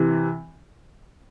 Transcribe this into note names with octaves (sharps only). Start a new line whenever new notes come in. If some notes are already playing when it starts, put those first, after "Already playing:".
Already playing: C3 E3